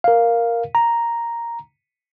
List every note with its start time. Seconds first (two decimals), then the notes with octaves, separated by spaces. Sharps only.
0.04 A#4 F5
0.75 A#5